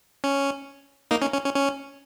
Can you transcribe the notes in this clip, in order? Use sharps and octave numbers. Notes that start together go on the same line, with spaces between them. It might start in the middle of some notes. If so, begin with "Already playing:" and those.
C#4
A#3 D#4
C#4
C#4
C#4
C#4